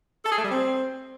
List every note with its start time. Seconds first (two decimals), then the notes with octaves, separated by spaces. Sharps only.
0.25 A4
0.31 G#4
0.38 A3
0.44 G3
0.50 C4